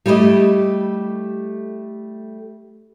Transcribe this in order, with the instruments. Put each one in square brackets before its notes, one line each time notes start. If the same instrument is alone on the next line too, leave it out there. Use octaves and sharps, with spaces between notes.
[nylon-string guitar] G3 A3 E4 G4 D#5